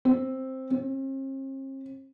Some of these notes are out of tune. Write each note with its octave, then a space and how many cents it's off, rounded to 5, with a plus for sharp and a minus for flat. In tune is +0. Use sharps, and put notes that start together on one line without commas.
C4 +5
C4 +45